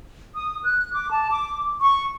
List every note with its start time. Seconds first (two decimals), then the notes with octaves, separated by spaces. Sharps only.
0.35 D#6
0.64 F#6
0.93 D6
1.10 A5
1.30 D6
1.81 C#6